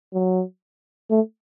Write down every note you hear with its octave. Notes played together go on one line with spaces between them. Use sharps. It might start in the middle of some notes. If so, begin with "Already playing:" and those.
F#3
A3